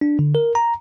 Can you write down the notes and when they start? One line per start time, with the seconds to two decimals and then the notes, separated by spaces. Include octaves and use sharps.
0.01 D4
0.19 D3
0.35 A#4
0.55 A#5